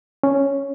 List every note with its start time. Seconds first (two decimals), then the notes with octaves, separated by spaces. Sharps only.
0.23 C#4